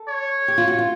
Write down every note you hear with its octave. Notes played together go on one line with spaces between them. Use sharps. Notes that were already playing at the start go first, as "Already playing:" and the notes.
Already playing: A4
C#5
G4
F4
F#4
F4